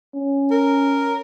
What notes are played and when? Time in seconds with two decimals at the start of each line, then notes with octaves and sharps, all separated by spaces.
0.15 C#4
0.51 A#4